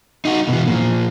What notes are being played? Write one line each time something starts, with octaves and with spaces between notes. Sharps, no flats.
D#4 F#4
B2 E3
A#2 F3